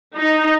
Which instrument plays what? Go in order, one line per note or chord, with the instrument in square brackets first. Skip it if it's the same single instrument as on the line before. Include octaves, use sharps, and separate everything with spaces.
[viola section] D#4